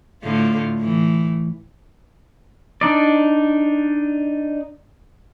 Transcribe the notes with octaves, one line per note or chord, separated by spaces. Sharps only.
A2 D3 F4
A2 E3
D4 D#4 D5